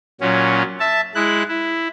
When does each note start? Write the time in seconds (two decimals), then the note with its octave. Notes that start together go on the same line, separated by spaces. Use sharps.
0.21 A#2 F#3 C#4
0.80 E5 A5
1.15 G#3 E4 F#6
1.48 E4